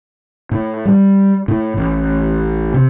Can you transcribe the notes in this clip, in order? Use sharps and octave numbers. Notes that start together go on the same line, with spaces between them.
A2
G3
A2
A1
C3